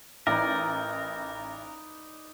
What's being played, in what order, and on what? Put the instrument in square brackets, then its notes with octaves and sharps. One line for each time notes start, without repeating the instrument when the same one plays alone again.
[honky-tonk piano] A1 [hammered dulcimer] D#4 B4 D5 [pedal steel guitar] A#4